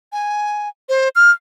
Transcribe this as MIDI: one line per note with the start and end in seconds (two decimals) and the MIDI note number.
0.12 0.69 80
0.89 1.09 72
1.16 1.31 89